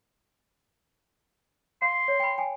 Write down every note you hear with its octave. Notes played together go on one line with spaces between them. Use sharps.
F5 C6
C#5
G5 B5
G5 G#5